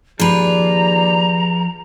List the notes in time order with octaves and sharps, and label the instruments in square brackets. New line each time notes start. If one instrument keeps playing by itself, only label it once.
[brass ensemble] D#2 G4 D5 [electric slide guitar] F3 [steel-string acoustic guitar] G#4 B4 [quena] A#5